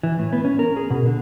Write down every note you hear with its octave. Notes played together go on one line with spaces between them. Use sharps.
E3
A2
B3
C#4
A#4
G#4
B2
D3